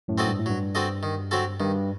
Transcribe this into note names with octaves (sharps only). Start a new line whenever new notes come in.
F#2 A2
C4 F#4 A4 D#5
G2
A2
G2 F#3
C4 F#4 A4 D#5
D#3
F#3 C4 F#4 A4
G2 D#3